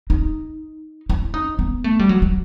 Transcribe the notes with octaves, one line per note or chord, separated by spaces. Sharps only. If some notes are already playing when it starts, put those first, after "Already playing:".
D#4
E4
D#4
B3
A3
G3
F#3
F#3